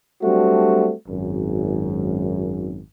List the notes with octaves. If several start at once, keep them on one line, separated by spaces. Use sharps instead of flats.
F#3 G3 A3 C4 D4 F#4
G#1 F#2